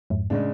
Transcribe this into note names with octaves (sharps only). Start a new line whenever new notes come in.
F2 G#2
A2 C#3 G#3 D4